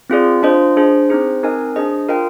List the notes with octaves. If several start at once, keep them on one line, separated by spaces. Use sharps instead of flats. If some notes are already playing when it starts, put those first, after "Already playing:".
C4 F4 G#4 D5
D4 F4 C5 D#5
D4 G#4 C5
C4 D#4 G#4 C5
C4 D#4 A#4 D#5 G#5
D4 G#4 C5 D#5
F4 A#4 D#5 G5